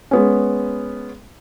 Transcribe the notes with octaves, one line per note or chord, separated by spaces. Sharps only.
G#3 B3 C#4